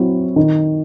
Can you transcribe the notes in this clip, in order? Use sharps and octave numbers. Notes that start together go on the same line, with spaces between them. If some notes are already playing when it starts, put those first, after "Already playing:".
Already playing: F#3 C4 E4
D#3